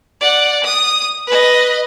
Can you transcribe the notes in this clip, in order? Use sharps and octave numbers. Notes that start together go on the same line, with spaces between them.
D5 F#5
D#6
B4 D#5